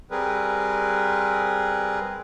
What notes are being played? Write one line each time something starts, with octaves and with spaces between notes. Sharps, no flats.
G3 C4 G#4 A#4 B4